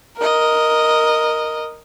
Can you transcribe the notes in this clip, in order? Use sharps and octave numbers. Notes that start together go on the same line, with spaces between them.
A#4 D#5